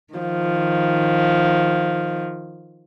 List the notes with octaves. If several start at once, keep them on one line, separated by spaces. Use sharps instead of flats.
D#3 F3